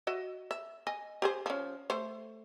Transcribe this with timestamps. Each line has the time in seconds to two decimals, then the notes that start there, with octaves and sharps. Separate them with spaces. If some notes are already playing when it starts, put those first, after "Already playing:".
0.07 F#4 D#5 E5
0.51 E5
0.87 D#5 G#5
1.22 G4 G#4 C5
1.46 F3 C#4
1.90 A3 C5